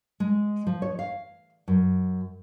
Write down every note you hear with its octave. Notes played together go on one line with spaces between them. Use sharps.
G#3
F3
C#5
F5
F#2